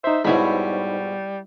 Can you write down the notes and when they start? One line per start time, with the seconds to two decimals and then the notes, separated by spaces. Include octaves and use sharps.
0.04 D#4 C5 E5
0.25 G#2 B2 G3 E4 C#5 B5